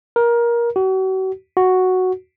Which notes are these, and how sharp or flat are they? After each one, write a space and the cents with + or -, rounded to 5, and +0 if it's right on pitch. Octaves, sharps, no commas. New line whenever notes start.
A#4 +20
F#4 +40
F#4 +0